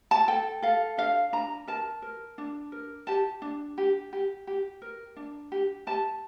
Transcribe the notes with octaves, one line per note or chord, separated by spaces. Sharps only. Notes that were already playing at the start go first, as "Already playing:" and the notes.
A5
A4 G5
A4 F5
D4 F5
D4 A#5
A#4 A5
A#4
D4
A#4
G4 A5
D4
G4
G4
G4
A#4
D4
G4
G4 A5